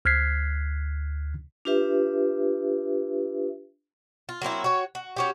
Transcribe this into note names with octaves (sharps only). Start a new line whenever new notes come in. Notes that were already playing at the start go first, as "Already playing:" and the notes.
D2 F6 F#6 G#6 B6 C7
D4 F4 G4 B4 E5
F4
F#3 A#3 C4 E4
F#4 C#5
F#4
C#4 F#4 G4